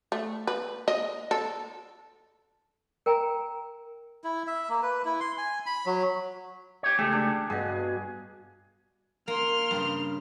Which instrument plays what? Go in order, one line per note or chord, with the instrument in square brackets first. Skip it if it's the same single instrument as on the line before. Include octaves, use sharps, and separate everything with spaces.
[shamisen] A3
B4
D#5
A4
[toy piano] A#4 G5 G#5 A#5
[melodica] E4
E5
A#3
B4
E4
C6
G#5
B5
F#3
[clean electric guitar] G4 C#5
[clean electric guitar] C#2 A3 [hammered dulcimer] G4 G#4
[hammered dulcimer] D4
[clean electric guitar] G2 [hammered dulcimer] B2 G#4
[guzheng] A#3 [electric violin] C6 F6
[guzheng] G2 C#3